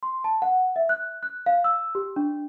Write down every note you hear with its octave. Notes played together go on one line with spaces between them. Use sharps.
C6
A5
F#5
E5
F#6
F#6
F5
E6
G4
D4